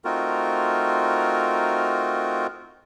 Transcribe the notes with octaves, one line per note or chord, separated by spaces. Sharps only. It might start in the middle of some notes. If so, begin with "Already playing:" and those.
A3 C4 D#4 F4 F#4 A#4